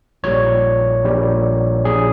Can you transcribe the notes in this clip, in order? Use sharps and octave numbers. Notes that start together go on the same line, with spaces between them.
A#1 A#2 G3 C#5
A#1 A#2 G3
A#1 A#2 G3 G#4